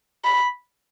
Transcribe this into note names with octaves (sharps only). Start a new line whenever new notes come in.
B5